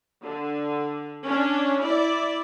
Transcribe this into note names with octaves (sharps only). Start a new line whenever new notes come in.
D3
C#4 D4
E4 D5